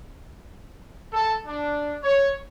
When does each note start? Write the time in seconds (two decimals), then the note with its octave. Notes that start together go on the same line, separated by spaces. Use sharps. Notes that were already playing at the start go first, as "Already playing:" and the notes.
1.13 A4
1.46 D4
2.03 C#5